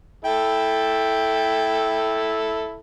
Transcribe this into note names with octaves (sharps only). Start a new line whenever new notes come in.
E4 A4 G5